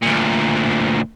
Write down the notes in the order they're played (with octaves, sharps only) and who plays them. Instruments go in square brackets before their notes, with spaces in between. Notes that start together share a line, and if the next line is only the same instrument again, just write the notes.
[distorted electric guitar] D2 A#2